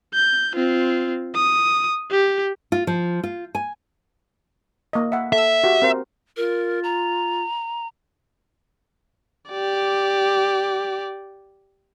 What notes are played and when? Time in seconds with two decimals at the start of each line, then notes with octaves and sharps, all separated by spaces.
0.14 G6
0.55 C4 F4
1.35 D#6
2.11 G4
2.72 F4
2.87 F3
3.23 F4
3.55 G#5
4.93 A#3 D#5
5.12 E5 F#5
5.33 A4 E5
5.64 F#4 G4
5.82 C4 A#4 C5
6.37 F4 A#4
6.84 A#5
9.51 G4 D5